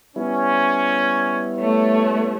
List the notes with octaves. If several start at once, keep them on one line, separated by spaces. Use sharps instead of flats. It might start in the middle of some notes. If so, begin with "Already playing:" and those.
G3 B3 C#4 E4
A3 C#5